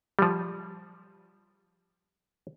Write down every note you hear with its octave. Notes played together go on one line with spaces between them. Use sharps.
F3 G3